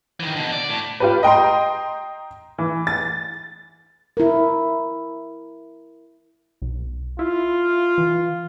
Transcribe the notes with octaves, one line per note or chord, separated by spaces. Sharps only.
D#3 E3
B2 D3
D5
A2
F4 G4 B4
D#5 G5 A#5 C6
E3
A6
E4 A#4
B1
E4 F4
E3